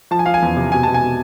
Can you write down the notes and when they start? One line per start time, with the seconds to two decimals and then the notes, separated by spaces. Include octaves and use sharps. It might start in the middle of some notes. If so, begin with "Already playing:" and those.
0.11 F3 A5
0.19 G#5
0.26 F3 F5
0.34 G#5
0.42 E2
0.57 C3
0.72 B2 G#5
0.83 B2 A5
0.94 G#5
1.02 B2